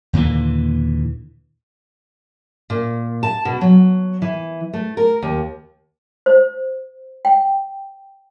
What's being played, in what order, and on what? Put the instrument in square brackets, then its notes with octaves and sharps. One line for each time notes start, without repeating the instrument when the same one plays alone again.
[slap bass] D#2 A#2 D3 E3
[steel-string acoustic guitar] A#2
A5
B2
F#3
E3
A3
A#4
D#2
[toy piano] C5
G5